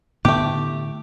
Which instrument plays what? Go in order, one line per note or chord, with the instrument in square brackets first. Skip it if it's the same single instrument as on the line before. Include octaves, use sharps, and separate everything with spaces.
[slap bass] A2 D3 B3 [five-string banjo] A3 G4